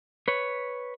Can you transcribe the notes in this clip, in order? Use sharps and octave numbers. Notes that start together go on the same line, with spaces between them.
B4 C#5